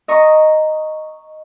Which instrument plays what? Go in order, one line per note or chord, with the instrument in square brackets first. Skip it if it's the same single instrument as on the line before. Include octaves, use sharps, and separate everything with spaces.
[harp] D#5 A#5 C#6